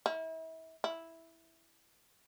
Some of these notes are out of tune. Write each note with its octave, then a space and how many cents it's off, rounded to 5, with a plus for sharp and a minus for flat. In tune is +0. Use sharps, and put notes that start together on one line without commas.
E4 -35
E4 -5